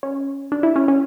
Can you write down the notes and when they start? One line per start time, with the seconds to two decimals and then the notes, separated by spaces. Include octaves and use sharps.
0.03 C#4
0.52 D4
0.63 E4
0.76 C#4
0.88 C#4